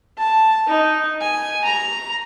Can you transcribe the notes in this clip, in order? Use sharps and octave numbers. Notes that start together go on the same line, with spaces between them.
A5
D#4
G#5
A#5